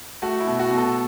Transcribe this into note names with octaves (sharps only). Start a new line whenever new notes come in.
A3 F#4
E4
B2
F#4
B2
A4